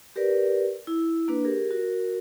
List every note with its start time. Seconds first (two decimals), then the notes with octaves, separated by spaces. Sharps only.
0.16 G4 A#4 B4 D5
0.87 E4
1.28 A#3 D4 B4
1.44 G4 G#4 A#4
1.71 F#4 A#4